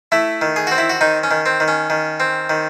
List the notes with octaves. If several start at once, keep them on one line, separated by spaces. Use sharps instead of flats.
A3 E4
D#3
G#4
C4 F#4
E4
F#4
D#3 D#4
C#4
D#3
C4
D#3
C#4
D#3
C4
D#3